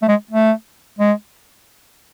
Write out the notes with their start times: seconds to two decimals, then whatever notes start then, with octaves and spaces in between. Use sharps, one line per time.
0.02 A3
0.08 G#3
0.31 A3
0.99 G#3